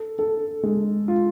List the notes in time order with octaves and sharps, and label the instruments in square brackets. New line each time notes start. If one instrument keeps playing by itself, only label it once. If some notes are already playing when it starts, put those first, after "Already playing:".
Already playing: [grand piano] A4
A4
G#3
F4